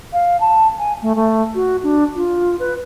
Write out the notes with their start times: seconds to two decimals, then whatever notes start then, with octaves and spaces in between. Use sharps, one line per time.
0.13 F5
0.41 A5
0.78 G#5
1.02 A3
1.15 A3
1.55 F#4
1.83 D4
2.15 F4
2.59 B4